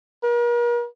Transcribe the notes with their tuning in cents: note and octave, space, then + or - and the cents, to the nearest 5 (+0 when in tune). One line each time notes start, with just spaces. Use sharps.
A#4 +40